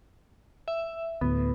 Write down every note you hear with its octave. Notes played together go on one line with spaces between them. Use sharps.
E5
D2 A2 B3